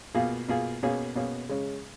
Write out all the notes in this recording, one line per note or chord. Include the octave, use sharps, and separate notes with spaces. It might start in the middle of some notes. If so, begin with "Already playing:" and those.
B2 A#3 F4 G#4
B2 A#3 F4 G#4
B2 A#3 C#4 G#4
B2 A#3 C#4 G#4
C#3 G#3 C#4